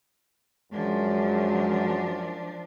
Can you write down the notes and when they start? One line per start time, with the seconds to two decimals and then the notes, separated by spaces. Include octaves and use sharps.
0.72 F#2 F3 G#3 D4